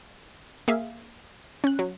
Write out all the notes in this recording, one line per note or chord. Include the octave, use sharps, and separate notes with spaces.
A#3 G#4 E5 F5
C#4 F#6
F#3